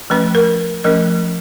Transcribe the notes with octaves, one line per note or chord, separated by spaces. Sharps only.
F3 A3 C#4 B4
A#4
F3 A3 C#4 A#4